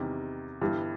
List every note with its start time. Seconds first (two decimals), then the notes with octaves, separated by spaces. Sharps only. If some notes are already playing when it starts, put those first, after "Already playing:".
Already playing: E2 C3 D#3 G3
0.61 G1 G2 E3 G3